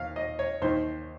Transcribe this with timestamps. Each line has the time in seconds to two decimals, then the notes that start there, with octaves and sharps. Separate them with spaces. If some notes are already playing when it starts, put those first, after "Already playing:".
Already playing: D#2 D#3 F5
0.16 D#5
0.39 C#5
0.62 D#2 D#3 C5